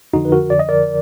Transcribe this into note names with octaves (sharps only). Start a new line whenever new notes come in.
F2 D3 F3 D#4 F#4
B4
F#4 A#4
D5
D#5
A#4 D5